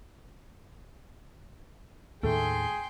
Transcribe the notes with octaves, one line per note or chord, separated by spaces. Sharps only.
D#2 A2 D#3 A3 G#4 G5 C6